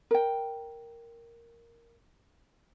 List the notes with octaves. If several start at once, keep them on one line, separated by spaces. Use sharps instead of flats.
A#4 G5